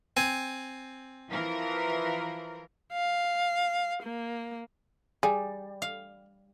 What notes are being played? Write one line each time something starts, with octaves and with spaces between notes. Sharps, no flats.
C4 G#5
E3 F3 A#4
F5
A#3
G3 G#4
F5